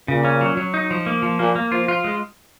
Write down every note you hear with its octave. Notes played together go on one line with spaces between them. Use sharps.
A#2 C#3
C#4
F#3
F#3
D#4
F3
A#3
F3
A#2 A#3
A#3
F3 F4
F4
G#3